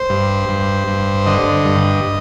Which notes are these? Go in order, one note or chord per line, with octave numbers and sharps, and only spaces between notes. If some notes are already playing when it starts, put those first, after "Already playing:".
Already playing: C5
G2
G2
G2
D3 D#5
G2